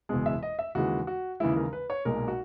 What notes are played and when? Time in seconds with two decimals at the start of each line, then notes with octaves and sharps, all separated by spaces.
0.09 F#1 E2 B2 G#3
0.26 E5
0.43 D#5
0.59 E5
0.75 D#2 C#3 E3 G#3 F#4
1.07 F#4
1.40 D#2 C#3 E3 G#3 E4
1.57 A#4
1.73 B4
1.90 C#5
2.05 B1 A#2 G#3 A#4
2.28 F#4